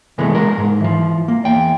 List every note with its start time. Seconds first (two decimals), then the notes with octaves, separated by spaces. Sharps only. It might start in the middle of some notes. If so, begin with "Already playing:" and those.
0.18 C3 E3 G#3 A3 B3
0.35 F3 G#3 A#4
0.58 G#2
0.80 E3 F3
1.28 A#3
1.45 E2 G5